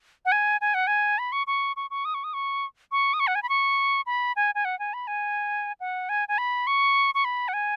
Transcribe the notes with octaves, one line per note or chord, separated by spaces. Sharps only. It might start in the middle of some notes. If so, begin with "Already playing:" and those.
F#5
G#5
G#5
F#5
G#5
B5
C#6
C#6
C#6
C#6
D#6
C#6
D#6
C#6
C#6
D#6
C#6
F#5
G#5
B5
C#6
B5
G#5
G#5
F#5
G#5
B5
G#5
F#5
G#5
G#5
B5
C#6
C#6
B5
F#5
G#5